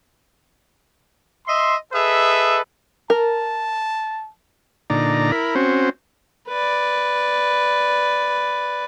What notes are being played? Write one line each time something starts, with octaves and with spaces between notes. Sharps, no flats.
D#5 E5 C6
G#4 A4 B4 D#5 E5
A#4 A5
A#2 D3 D#4 D5 A#5
E4 A#4 B5
C4 C#4 F#4 C5
B4 D5